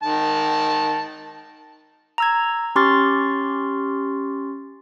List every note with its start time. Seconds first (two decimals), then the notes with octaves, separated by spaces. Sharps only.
0.03 D#3 A5
2.18 A#5 E6 G#6
2.76 C#4 G4 C6 C#6 F6 A6